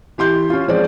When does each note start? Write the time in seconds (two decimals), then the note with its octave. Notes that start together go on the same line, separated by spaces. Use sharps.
0.18 E3 G4 C6 G6
0.50 C#4 F4
0.68 F3 G#3 C4 C5 D5